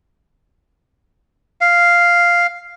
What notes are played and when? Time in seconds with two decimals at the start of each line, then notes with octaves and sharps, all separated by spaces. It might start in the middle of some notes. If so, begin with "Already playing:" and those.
1.61 F5